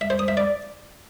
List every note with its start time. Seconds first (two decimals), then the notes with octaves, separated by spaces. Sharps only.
0.01 E5
0.10 C5
0.19 D#6
0.28 E5
0.37 D5